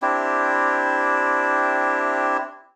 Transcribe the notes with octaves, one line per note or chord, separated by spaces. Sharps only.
C4 D4 E4 G4